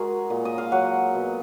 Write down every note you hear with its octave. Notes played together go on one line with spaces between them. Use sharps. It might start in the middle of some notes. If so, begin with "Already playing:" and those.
Already playing: G#3 F#4 G#4 A#4
A#2
D#5
F5
F#3 F#5
B2